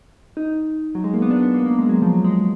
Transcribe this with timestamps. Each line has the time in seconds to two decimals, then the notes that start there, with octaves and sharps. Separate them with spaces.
0.37 D#4
0.95 F#3
1.04 G#3
1.14 A#3
1.22 B3
1.31 D4
1.43 B3
1.54 A#3
1.66 A#3
1.78 G#3
1.89 F#3
2.02 F3
2.13 F#3
2.24 G#3